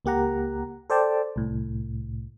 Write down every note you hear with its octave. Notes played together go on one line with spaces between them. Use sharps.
C#2 A#3 G4 F#5 A#5
A4 C5 D5 G5 A5
C2 A2